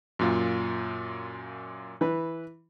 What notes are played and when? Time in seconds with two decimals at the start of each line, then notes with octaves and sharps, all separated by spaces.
0.19 F#2 A#2 F4
2.01 E3 B4